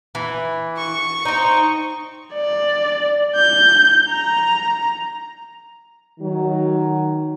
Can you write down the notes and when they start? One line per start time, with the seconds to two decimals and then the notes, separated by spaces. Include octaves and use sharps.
0.15 E3
0.77 C#6
1.25 C4 D#4
2.34 D5
3.36 G6
4.10 A#5
6.20 D#3 F#3